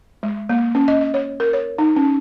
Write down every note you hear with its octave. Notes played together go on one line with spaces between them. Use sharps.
G#3
A#3
C#4
D#5
D#5
C#5
A#4
C#5
D#4
C#4